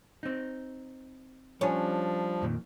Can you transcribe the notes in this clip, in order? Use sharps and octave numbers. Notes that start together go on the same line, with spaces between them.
C4 D#4
F3 G3 C#4 D4
F2 A#2 D#3